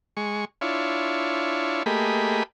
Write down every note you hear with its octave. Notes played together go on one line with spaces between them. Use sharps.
G#3 C#6
D4 E4 F4 C#5
A3 A#3 G4 G#4 D#5 B5